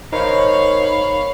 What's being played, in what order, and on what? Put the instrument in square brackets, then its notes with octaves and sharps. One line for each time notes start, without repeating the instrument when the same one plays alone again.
[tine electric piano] D#4 A#4 C5 [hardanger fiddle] C#5 F5 [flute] B5